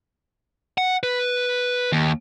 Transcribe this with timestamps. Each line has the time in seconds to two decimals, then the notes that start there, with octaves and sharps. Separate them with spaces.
0.78 F#5
1.03 B4
1.92 D#2